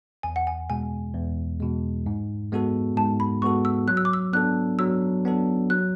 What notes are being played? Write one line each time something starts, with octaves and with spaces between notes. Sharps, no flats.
E2 G#5
F#5
G#5
B2 G#3 G#5
E2
B2 G#3
G#2
G#3 B3 F#4 A4
G#2 A5
B5
G#3 B3 F#4 A4 C#6
E6
F#3 F#6
E6
D6
E6
B3 D4 A4 F#6
F#3 E6
B3 D4 A4
F#3 F#6